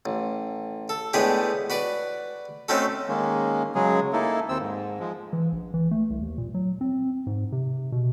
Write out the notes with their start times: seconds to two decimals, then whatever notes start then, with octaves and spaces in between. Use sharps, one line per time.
0.06 A1
0.89 A4
1.13 A2 G#3 B3 D4 G4 G#4
1.70 F#4 B4 D5
2.69 A3 C4 C#4 D#4 F#4 A4
3.08 D#3 G#3 A#3 C#4
3.75 C#3 F#3 G#3 G#4
4.13 A#3 D#4 E4 A4
4.49 D#2 C4 E6
4.61 G#2
5.00 F3 G#3
5.33 E3
5.52 A#1
5.74 E3
5.91 A3
6.10 C2
6.22 D#2
6.38 A#2
6.54 F#3
6.81 C4
7.27 G#2
7.52 C3
7.92 B2